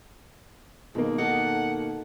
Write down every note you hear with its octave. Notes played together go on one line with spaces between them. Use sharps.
F2 B2 D#3 G#3 A#3
D#4 F#4 A4 F#5